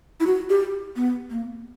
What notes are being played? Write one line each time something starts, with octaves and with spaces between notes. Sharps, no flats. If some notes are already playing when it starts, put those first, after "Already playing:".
E4
F#4
G4
B3
A#3